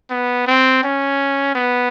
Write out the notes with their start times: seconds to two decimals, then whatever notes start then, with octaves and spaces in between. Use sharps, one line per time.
0.10 B3
0.47 C4
0.84 C#4
1.55 B3